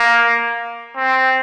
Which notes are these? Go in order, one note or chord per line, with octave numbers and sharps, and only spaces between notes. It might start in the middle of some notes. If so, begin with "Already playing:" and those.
Already playing: A#3
C4